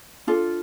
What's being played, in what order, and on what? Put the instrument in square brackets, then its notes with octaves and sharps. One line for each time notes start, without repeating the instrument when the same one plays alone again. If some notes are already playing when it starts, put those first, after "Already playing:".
[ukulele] D4 F4 A4